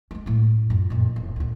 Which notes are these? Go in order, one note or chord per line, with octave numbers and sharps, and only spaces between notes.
G#3 C#4
A2 C#4
F#2 F4
F2 A#2
E1
D2 A#2